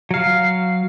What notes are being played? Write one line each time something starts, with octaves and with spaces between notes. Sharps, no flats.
F#3 F5